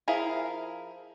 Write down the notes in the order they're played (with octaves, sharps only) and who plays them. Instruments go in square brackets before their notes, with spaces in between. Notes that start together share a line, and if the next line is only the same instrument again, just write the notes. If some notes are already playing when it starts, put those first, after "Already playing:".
[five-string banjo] F3 E4 G#4 A#4 F5